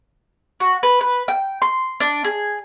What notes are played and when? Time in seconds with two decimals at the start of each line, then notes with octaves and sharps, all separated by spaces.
0.60 F#4
0.83 B4
1.01 B4
1.28 G5
1.62 C6
2.00 D4
2.24 G#4